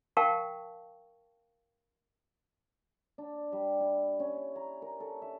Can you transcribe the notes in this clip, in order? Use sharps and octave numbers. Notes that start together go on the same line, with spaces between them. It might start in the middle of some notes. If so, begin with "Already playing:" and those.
A#4 F5 G5 A5 C#6
D4
G3
E4
C#4
A#5
A#4
A4
E5